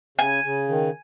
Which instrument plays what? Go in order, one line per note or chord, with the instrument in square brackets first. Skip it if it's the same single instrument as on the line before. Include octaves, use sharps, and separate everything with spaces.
[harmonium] C#3 [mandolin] G#5
[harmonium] C#3
D#3